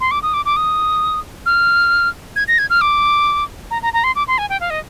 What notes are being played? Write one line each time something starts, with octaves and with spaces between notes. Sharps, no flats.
C6
D6
D#6
D6
D6
D#6
F6
G#6
A#6
G#6
F6
D6
A#5
A#5
A#5
C6
D6
C6
G#5
G5
F5
D#5